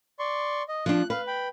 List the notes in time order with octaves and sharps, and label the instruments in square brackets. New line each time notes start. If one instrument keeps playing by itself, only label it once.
[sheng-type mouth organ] D5 C6 C#6
D#5
[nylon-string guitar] F3 D4 [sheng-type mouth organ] F#6
[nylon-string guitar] B4 [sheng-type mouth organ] F5
[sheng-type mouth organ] G5 B5